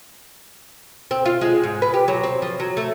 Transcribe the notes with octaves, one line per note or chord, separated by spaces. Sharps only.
C4
F4
G#3
G#2
B4
G4
F#3
C4
F3
F#3
A3